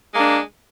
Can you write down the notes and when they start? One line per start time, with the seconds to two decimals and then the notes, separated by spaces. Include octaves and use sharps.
0.13 G#3
0.16 A#3
0.19 D4